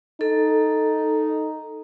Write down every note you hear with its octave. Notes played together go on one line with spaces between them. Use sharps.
D#4 A4